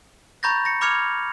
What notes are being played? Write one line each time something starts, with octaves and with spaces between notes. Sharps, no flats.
A#5 B5 C#6 G6 A6 A#6
A#6 C#7
B5 D6 F6 G#6 C#7 F7